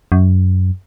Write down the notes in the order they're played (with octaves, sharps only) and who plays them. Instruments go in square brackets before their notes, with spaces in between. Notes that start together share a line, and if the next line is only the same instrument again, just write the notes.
[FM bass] F#2